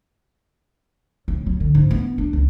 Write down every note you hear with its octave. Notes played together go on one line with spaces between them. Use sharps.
A2
F#3
D3
G#2
B3
D4
C#2